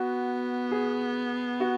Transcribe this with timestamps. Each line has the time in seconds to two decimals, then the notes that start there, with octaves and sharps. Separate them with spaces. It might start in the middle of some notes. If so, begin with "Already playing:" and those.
Already playing: B3 F#4
0.71 G#4
1.60 F#4